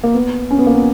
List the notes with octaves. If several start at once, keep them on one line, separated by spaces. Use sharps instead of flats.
A#3
B3
C#4
B3
A#3
B3